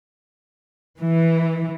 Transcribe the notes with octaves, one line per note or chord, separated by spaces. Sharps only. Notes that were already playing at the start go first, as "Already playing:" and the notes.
E3